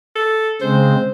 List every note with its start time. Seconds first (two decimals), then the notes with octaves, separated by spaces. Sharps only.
0.16 A4
0.62 C#3 G#3 C4 C5